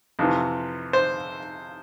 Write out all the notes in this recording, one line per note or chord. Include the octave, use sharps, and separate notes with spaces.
F2 C3 E3
C5